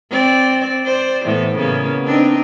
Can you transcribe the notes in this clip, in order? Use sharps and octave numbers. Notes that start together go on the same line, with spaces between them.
C4 D5
C5 D5
A2 E3 B3
C#3 A#3 B3
C4 D4 D#4